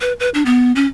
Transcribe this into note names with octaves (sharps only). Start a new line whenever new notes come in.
B4
B4
D4
B3
C#4